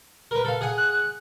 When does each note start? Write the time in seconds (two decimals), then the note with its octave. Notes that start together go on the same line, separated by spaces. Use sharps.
0.31 A#4 B4
0.45 A4 F5
0.61 G#4 F#5 G#5
0.78 F#6